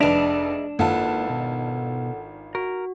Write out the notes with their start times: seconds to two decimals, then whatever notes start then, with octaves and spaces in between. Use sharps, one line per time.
0.01 F1 D4 G#4 B4 D#5 E5 F7
0.79 G#1 A#3 E4 F4 A4 B4 F#5 A5
1.29 B2
2.55 F#4 A#4